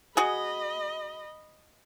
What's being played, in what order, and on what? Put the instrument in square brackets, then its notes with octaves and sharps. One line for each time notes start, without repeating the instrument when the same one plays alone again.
[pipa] F#4 G#4 [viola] D#5 B5